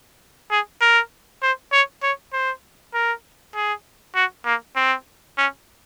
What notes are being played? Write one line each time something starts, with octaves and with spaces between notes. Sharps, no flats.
G#4
A#4
C5
C#5
C#5
C5
A#4
G#4
F#4
A#3
C4
C#4